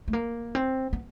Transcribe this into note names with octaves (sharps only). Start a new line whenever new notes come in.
A3
A#3
C4
B3